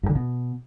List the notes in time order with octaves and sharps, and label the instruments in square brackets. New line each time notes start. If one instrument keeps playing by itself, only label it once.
[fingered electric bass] G2
D3
B2